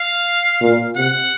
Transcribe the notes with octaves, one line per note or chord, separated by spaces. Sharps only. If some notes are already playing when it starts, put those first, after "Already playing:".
Already playing: F5
A#2
C3 F#5